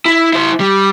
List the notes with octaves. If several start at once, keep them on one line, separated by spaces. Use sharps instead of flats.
E4
E4 C5
G3